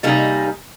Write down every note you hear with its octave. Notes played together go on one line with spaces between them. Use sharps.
C3 G3 A#3 D#4 G#4